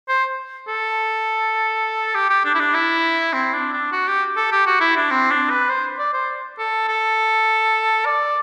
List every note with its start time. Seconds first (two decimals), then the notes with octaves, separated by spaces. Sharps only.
0.08 C5
0.68 A4
2.15 G4
2.30 G4
2.45 D4
2.55 E4
2.60 D4
2.74 E4
3.33 C4
3.54 D4
3.73 D4
3.92 F#4
4.08 G4
4.36 A4
4.52 G4
4.66 F#4
4.80 E4
4.96 D4
5.11 C4
5.31 D4
5.50 B4
5.69 C5
5.99 D5
6.13 C5
6.58 A4
6.88 A4
8.05 D5